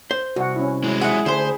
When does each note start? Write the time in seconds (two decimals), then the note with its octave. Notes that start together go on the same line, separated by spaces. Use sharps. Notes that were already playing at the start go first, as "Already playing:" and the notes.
0.11 C5
0.36 C2 F#4 F#5
0.56 C#4 E4
0.84 F#3 G#3 E4
1.01 E4 G#4 F#5
1.26 D2 C5 C6